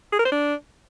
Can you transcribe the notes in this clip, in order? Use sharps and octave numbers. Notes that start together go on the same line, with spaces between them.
G#4
A#4
C5
D4